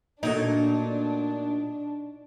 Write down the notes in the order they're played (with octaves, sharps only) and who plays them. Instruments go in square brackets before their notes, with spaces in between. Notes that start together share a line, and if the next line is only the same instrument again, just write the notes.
[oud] A#2 F#3 A3 [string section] D4 [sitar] D#4